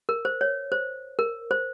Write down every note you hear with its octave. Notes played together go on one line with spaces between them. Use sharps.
A#4
C5
C#5
C5
A#4
C5